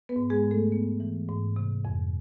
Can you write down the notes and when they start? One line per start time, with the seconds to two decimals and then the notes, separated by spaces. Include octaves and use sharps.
0.09 B3 B4
0.16 G#2
0.30 G#3 G#4
0.44 G#2
0.51 A3 A4
0.72 B3
1.00 E3
1.29 G#2
1.56 C3
1.85 F2